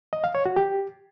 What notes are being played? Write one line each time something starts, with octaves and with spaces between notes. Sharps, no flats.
D#5
F5
C#5
F#4
G4